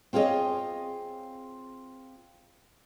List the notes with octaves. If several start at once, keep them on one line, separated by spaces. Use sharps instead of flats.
C4 F4 G#4 C#5 D#5